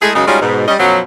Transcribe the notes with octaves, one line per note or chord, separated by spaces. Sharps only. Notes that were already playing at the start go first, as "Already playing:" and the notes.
G#3 A3 E4 G#4
F#2 C#3 G#3 D#4
G3 G#3 C#4 D#4 F4 F#4
G#2 B2
G3 C#4 D#5
F#2 B2 F3 F#3